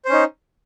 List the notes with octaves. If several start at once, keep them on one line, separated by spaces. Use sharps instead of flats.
C#4 D#4 C5